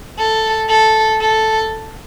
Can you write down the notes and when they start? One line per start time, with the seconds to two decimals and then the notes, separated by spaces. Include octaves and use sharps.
0.18 A4
0.69 A4
1.21 A4